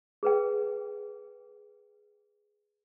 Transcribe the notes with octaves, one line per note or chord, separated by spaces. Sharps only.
G#4 B4 G5